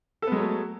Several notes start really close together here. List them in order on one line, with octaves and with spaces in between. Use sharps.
A4 B3 G#3 F#3 A3